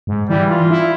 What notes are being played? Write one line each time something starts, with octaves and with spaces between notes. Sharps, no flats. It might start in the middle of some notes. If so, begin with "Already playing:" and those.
G#2
E3 G3
F4
E4